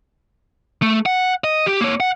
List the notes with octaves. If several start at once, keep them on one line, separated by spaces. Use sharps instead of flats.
A3
F#5
D#5
G4
A#3 C#5
F#5